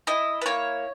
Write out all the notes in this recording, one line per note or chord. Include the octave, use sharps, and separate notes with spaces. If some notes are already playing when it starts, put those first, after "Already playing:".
E4 D#5
B4
A#3 C#5